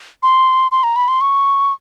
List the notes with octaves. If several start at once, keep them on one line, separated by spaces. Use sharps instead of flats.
C6
C6
A#5
B5
C6
C#6